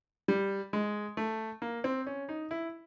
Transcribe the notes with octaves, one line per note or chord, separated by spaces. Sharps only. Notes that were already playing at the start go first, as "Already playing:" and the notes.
G3
G#3
A3
A#3
C4
C#4
D#4
E4